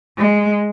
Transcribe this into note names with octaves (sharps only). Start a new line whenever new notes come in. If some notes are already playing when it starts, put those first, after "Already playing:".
G#3